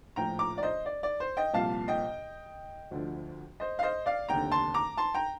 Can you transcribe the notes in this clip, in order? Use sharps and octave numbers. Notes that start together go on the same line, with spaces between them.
A#1 A2 F3 G5 A#5
A#5 D6
D5
C5 D#5
D5
D5
C5
D#5 G5
C2 A#2 F3 F5 A5
D#5 G5
D2 D3 F3
C5 D#5
F5
C5 D#5
D5 F5
F1 D#2 D3 G5 A#5
A5 C6
A#5 D6
A5 C6
G5 A#5